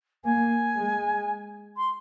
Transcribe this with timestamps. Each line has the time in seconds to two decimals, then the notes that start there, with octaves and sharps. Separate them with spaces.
0.25 A#3 G#5
0.76 G#3
1.77 C6